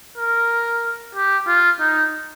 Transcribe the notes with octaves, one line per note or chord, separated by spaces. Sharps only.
A#4
G4
F4
D#4